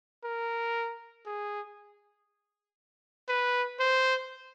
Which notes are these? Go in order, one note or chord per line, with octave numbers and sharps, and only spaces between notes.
A#4
G#4
B4
C5